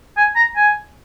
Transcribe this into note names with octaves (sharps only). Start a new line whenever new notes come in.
G#5
A#5
G#5